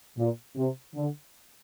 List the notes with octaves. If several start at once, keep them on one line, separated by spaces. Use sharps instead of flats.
A#2
C3
D3